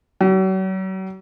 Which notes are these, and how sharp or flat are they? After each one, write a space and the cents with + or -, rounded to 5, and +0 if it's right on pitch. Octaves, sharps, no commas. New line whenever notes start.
F#3 +40